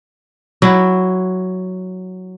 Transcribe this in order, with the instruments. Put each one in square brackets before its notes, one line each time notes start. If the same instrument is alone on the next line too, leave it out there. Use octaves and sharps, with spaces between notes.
[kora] F#3 E4